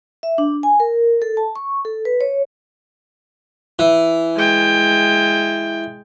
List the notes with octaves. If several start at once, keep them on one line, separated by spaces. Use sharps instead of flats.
E5
D4
G#5
A#4
A4
A5
C#6
A4
B4
C#5
E3
G#3 G5